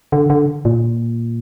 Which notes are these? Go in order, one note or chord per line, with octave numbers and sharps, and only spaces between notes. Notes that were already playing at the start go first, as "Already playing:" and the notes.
D3
D3
A#2